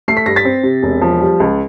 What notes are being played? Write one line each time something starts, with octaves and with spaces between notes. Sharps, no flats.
A3 C7
B6
G2 A#6
A6 B6
C4
C3
E1
F3
G3
C#2